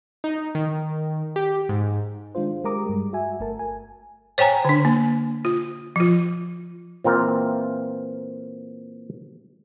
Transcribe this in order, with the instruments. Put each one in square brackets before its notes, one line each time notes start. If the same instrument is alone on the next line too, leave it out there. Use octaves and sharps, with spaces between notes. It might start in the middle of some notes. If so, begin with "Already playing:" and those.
[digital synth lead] D#4
D#3
G4
G#2
[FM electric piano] D#3 G#3 D4 F4 C5
G#3 G4 A#4 A#5 D6 D#6
G2 G3 G#3
F#4 E5 G#5
G1 A3 A#4 A5
G#5
[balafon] C5 C#5 G5 G#5 A#5
D3 D4
A#3
F4
F3 F4
[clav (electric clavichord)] A#2 E3 C4 F4 A#4